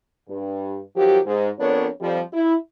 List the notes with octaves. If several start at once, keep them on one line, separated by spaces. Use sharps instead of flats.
G2
D#3 F3 F#3 G4
G#2
F2 B3 D4 A#4 C#5
F2 F3 G3
E4